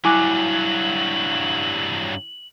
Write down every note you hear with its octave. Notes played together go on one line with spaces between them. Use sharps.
G2 F#3 E4 G#5 D6 F#6 F#7